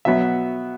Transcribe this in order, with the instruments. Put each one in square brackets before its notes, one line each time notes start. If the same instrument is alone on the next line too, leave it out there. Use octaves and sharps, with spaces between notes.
[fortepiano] B2 F#3 B3 E5